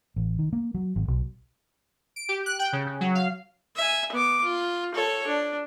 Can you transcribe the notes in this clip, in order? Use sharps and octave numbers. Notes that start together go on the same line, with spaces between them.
A1
D#3
A#3
F#3
G#1
B1
D7
G4
F#6
G5
C#3
C#3
F#3
F5
E5 G#5
B3 D6
F4
A4 C#5
D4